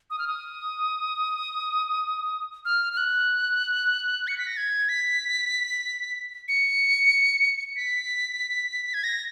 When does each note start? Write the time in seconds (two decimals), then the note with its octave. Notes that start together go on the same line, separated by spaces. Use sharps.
0.10 D#6
0.19 F6
0.27 D#6
2.65 F6
2.93 F6
2.97 F#6
4.28 C#7
4.38 B6
4.47 A#6
4.57 G#6
4.89 B6
6.48 C#7
7.76 B6
8.94 G#6
9.04 A#6